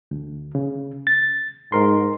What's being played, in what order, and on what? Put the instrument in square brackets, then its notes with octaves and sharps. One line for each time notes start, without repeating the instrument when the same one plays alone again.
[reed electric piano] D2
C#3
A6
[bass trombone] G#2 [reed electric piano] A#4 C6